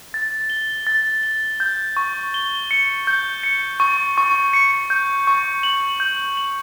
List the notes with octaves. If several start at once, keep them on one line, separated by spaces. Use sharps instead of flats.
A6
G7
A6
G7
G6
C#6
G7
C#7
G6
C#7
C#6
C#6
C#7
G6
C#6
F#7
G6
F#7